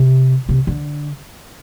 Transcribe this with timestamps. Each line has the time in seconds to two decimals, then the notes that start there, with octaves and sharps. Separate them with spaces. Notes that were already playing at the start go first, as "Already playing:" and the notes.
Already playing: C3
0.49 C3
0.67 D3